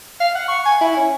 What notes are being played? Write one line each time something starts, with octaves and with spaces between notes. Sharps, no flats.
F5
F#5
C#6
G#5
E4
C#4